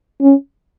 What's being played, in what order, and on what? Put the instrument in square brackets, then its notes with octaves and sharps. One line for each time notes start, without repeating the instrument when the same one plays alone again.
[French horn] C#4